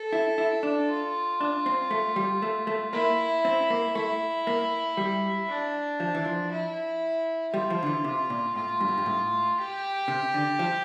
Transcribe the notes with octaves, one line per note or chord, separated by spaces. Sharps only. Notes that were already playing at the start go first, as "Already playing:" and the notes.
Already playing: A4
E4
E4
D4
F4
D4
C4
A3
G3
A3
A3
A#3 E4
C4
A#3
A3 E4
A#3
G3
D4
F3
E3
F3
E4
G3 F4
F3
D3
E3
C3
A#2
A2 F4
G2
A2
G2
A2
G4
C3
D3
F3